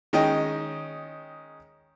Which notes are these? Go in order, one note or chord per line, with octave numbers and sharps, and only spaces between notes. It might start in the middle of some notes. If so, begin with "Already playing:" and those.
D#3 G#3 C#4 D#5 G5